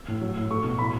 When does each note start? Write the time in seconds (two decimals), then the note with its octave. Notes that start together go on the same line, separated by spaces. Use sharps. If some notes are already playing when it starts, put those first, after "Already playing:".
Already playing: E6
0.08 A2
0.21 F#3
0.36 A2
0.51 A3 C#6
0.64 B2
0.78 A2 B5